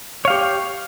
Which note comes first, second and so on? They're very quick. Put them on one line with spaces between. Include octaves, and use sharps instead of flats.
C#5 F5 G4